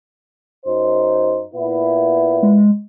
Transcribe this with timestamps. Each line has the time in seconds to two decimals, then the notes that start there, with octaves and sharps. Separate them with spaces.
0.66 F#2 D#4 C5
1.54 A#2 B3 E4
2.43 G#3